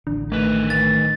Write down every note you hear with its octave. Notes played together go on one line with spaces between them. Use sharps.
A1 D3 D4
D#3 A3 B4
A3 A6